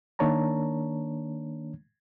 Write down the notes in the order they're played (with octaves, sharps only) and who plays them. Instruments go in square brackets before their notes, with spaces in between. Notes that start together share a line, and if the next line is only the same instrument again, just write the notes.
[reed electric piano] D#3 A#3 D4 C#5 A5 A#5